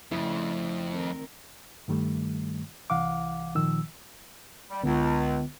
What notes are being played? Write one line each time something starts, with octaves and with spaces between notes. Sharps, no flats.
F2 C#3 A3 D4 E4
D#3 C4 A#4
G2 D#3 G3 A3
C2 E3 F5 F#5 D6
A#2 D#3 F3 E6
G3
C#2 D3 B3